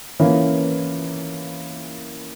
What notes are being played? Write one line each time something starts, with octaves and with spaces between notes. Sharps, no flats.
E3 A#3 C#4